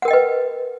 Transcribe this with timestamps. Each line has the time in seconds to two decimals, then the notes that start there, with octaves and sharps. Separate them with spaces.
0.02 F#5
0.05 A#4
0.08 G5
0.11 D#5
0.13 B4